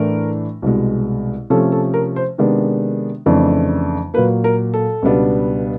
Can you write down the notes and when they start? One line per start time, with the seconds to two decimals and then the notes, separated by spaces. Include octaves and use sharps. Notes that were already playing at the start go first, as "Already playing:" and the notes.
Already playing: A2 E3 A3 D4 A#4
0.62 C2 B2 G#3
1.50 C3 F3 A3 C#4 A4
1.72 A4
1.94 A#4
2.16 C5
2.38 C3 D#3 G#3 B3 D4
3.26 F2 C#3 E3 A3 D4
4.14 A#2 F#3 A#3 B4
4.44 A#4
4.74 A4
5.02 C#2 B2 G3 B3 D4